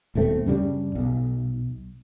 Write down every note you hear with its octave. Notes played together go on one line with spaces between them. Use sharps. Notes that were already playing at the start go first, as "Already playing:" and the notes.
D#1 B1 A3 C4
F#2 C#3 G3 D4
B1